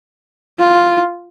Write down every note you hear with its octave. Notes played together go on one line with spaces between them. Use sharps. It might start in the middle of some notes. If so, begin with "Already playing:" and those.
F4